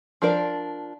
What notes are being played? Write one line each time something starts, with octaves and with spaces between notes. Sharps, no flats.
F3 D4 A#4 D5